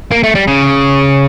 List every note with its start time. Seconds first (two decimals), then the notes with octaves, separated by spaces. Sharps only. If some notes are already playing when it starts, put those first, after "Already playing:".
0.11 A#3
0.23 A3
0.35 G3
0.48 C#3